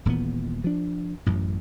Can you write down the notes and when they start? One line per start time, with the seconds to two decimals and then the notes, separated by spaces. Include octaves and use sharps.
0.05 D#1 A#2 E3 B3
0.64 F3 D4
1.26 A1 F#2